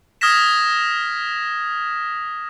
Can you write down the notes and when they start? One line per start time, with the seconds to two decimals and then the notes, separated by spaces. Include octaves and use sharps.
0.21 D#6 F6 G#6 A#6 B6 E7